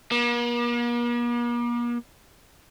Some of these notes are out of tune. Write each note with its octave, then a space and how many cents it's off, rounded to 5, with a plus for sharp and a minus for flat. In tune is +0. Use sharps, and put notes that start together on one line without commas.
A#3 +45